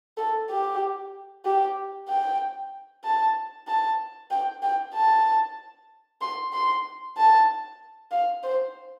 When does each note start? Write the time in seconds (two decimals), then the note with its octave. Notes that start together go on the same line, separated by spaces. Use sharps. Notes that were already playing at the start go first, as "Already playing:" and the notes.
0.17 A4
0.50 G4
1.45 G4
2.09 G5
3.04 A5
3.68 A5
4.31 G5
4.63 G5
4.94 A5
6.21 C6
6.53 C6
7.17 A5
8.11 F5
8.43 C5